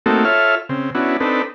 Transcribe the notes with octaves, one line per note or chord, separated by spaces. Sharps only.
A3 A#3 C4 D#4 F#4 A4
F4 A4 C#5 E5 F6
C#3 C4
B3 C#4 D4 E4 F#4
C4 D4 D#4 A4 B4